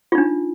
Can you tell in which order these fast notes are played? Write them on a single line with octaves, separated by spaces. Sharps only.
F4 D#4 D4